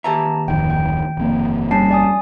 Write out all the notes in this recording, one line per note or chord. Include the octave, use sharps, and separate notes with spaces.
D#2 G4 B4 E5 A5 A#5
D1 F2 D#3 G5
G5
D#1 F2 A#3
G3 C#4 A5 C7
D5 G#5 D#6